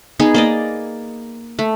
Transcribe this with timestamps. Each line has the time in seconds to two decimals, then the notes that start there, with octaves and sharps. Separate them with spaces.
0.19 B3 D#4 G#4
0.34 A#3 D5 D#5
1.59 A3